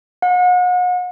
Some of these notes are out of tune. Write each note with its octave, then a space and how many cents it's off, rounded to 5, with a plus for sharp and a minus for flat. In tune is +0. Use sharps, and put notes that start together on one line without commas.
F#5 -40